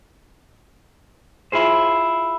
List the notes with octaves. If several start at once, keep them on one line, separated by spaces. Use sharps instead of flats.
E4 F4 G#4 C5